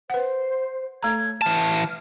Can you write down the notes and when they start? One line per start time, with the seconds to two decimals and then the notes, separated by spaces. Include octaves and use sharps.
0.10 B4 C5 F#5
1.03 A3 A4 C#5 A#5 G#6
1.42 E3 A5 F6